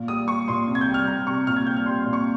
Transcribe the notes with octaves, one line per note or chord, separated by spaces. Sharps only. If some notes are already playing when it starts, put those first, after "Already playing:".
Already playing: A#2
G3 D#6
G3 C#6
A#2 C6
C3
G#6
G6
G3
F6
G3 A#5
C3 C#6
A#2 F6
G#6
G3 G6
F6
G3 C6
C6
A#2
C#6